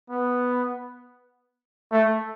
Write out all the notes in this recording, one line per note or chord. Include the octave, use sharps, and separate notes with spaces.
B3
A3